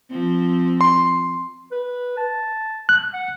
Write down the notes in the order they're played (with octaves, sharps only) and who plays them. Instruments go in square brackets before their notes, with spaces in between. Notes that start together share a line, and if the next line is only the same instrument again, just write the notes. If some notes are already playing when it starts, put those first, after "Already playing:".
[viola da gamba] F3 C4
[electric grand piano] C6
[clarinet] B4
A5
[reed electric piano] F#6
[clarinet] F#5